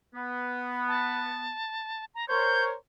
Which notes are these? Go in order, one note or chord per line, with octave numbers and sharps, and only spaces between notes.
B3
A5
A#5
A#4 C5 C#5 G6